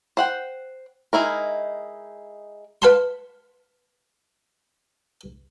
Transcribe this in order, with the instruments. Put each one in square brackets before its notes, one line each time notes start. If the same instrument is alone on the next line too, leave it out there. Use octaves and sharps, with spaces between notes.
[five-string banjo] C5 F#5 G5
G#3 D#4 E4 A#4
[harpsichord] B4 F5 F#5 A5 B5 C6